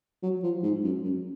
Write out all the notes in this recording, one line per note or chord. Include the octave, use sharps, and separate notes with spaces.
F#3
F3
G#2
F#2
F#2